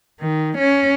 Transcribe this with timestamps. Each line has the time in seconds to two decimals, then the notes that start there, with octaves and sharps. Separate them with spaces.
0.21 D#3
0.58 C#4